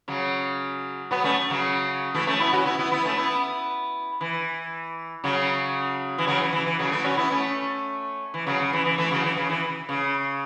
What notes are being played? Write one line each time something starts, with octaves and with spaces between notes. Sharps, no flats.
C#3 F#3
F#3 B3
A3 C#4
C#3 F#3
E3 A3
A3 C#4
B3 E4
C#4 F#4
B3 E4
B3 E4
B3 E4
A3 C#4
B3 E4
E3
C#3 F#3
E3
C#3 F#3
E3
E3
E3
C#3 F#3
E3 A3
C#4 F#4
B3 E4
A3 C#4
E3
C#3 F#3
C#3
E3
E3
E3 A3
C#3 F#3
E3
C#3
E3
C#3